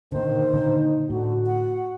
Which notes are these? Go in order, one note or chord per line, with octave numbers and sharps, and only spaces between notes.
A#2 D3 D#3 C5
A#2 D3 D#3 D#4
A2 D3 F#4
F#5